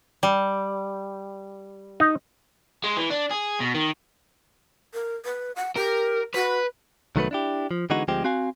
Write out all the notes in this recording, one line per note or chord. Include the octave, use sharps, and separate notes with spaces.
G3
D#4
G#3
E3
D4
G#4
B2
D#3
A#4
B4
F#5
G4 A#4
F#4 B4
C2 D#3 F#3 A3 B3 B4
D4 E4 G4
F3
D3 E3 G#3 B3 D#4 F#4
D2 F3 G#3 C4 G4
C4 F#4 F5 G#5